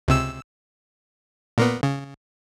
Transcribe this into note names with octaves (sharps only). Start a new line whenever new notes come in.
C#2 C3 E6
A#2 A#3 B3
C#3